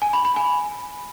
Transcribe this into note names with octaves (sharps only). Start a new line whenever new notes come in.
G#5
B5
B5
G#5